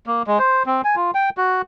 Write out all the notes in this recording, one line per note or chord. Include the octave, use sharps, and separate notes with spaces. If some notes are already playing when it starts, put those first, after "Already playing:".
A#3
G#3
C5
C4
G#5
F4
G5
F#4